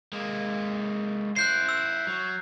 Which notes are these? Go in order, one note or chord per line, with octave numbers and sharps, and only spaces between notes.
G#3 A#3
E4 C5 F#6 G6 C7
E6
F#3